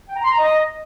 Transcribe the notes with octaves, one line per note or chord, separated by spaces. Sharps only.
G5
A#5
C6
A#5
D#5